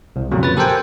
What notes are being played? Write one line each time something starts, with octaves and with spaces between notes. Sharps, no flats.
C2
F2 A#2 C#3 F#3
B4 A6
G4 A4 A#4 C5 G5 G#5